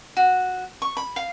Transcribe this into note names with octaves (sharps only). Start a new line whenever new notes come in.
F#4
C#6
B5
F5